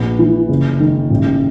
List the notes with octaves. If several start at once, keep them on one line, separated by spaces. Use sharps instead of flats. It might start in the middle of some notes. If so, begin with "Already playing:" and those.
Already playing: A#1 B3
E3
F#1
D#3
A1